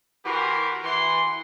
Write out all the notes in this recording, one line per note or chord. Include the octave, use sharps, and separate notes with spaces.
E3 F#4 G4 A#4 B4 C6
E3 F#5 C6